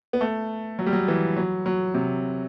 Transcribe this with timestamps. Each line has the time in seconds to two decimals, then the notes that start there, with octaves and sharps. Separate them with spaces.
0.13 B3
0.21 A3
0.79 F#3
0.86 G3
0.93 F#3
1.08 E3
1.37 F#3
1.66 F#3
1.94 C3